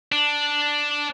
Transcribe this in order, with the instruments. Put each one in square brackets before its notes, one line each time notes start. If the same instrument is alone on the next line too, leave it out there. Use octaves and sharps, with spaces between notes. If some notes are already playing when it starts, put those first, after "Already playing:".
[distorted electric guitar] D4